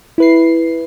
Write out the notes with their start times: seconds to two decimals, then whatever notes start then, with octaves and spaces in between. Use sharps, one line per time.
0.18 E4 B4 C7